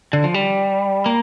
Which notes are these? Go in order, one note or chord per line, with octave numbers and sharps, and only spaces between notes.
D3
F3
G3
A#3